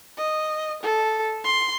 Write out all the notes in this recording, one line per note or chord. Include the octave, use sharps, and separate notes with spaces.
D#5
A4
C6